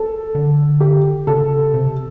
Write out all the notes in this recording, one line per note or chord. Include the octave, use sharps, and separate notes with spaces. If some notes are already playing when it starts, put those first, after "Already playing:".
Already playing: A4
D3
G4
C#3 A4
C3